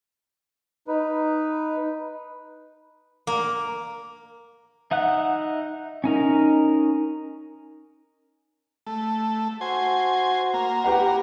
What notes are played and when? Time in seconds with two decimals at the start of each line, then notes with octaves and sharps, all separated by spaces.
0.88 D#4 B4
3.27 A#3
4.91 D#4 E5 F#5 F#6
6.04 C#4 D#4 A#4
8.87 A3
9.61 F#4 C5 G#5
10.54 A#3
10.84 G4 B4 F#5